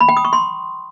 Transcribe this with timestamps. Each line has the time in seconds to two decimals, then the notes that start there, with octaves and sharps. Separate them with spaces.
0.01 B5
0.09 G5
0.17 D#6
0.25 C#6
0.33 C6